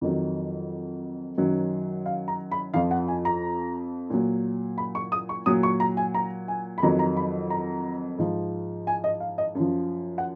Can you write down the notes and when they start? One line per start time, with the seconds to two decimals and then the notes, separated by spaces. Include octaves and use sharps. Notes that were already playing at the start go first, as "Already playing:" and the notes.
0.01 F2 D#3 F#3
1.37 F#2 D#3 F#3
2.06 F5
2.28 A#5
2.52 B5
2.74 F2 F3 F5
2.91 F#5
3.08 G#5
3.25 A#5
4.10 A#2 F#3
4.78 B5
4.95 C#6
5.12 D#6
5.29 C#6
5.46 A#2 F#3 D#6
5.63 C#6
5.80 A#5
5.97 G#5
6.14 A#5
6.48 G#5
6.78 B5
6.83 F2 D#3 F#3 A#5
6.99 A#5
7.17 B5
7.50 A#5
8.18 G#2 F3
8.87 G#5
9.04 D#5
9.20 F5
9.38 D#5
9.55 F#2 F3
10.18 F#5